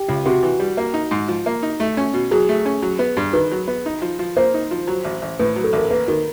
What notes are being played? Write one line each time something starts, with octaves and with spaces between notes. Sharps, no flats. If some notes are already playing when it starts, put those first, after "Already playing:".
Already playing: G4
C#2
C3 F#4
E3
G3
A#3
D#4
G#2
F3
A#3
D#4
A3
C#4
B2
F#3 G#4
A3
C#4
F#3
B3
G2
D#3 B4
F#3
B3
D#4
F3
F3
A#3 C5
D#4
F3
F#3
A1
A1
A2 B4
F#3
A4
A1 A#4
A#3 B4
D#3 A#4